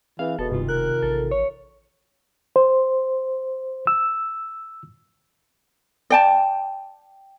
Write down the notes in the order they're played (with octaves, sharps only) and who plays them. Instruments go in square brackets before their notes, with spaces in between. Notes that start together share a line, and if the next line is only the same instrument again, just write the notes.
[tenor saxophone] E3 [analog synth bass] C4 [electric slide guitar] G#4 [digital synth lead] F5
[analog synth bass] E1 [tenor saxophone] B2 [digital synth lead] A4
[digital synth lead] G2 [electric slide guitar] C3 D#3 F4
[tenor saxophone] A#4 [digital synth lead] F#6
[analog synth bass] A1 [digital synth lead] A4
[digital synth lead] C#5
[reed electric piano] C5
E6
[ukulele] D5 G5 A5